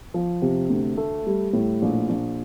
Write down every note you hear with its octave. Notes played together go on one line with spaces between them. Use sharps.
F3
C3
D2
A3
G3
A2
A#1
A#1